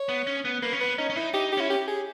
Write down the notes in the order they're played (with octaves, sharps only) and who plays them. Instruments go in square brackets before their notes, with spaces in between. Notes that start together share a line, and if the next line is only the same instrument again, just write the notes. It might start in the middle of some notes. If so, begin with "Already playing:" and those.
Already playing: [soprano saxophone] C#5
[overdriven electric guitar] B3
C#4
B3
[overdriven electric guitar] A#3 [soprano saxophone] B4
[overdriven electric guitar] C#4
[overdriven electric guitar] B3 [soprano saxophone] B4
[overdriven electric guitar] C#4 [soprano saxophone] D#4
[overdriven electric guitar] C#4
[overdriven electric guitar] D#4 [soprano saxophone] E4
[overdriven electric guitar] D#4 [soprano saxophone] G4
[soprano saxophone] G4
[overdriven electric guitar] C#4 [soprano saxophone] E4
[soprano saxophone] G4
G#4